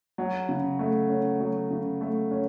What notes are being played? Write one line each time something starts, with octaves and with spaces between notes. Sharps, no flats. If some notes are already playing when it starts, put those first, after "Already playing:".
F#3
C#3
A3
C#4
F#3
C#3
A3
C#4